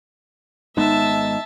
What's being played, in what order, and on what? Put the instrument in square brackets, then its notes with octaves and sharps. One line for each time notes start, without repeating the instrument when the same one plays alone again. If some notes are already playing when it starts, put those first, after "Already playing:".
[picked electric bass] G#1 G#3 B3 [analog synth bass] D#4 [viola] E5 A5